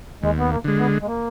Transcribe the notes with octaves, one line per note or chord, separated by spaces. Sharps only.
D#2 G#3
B3
A#3
D3 G#3
B3
G#3
A#3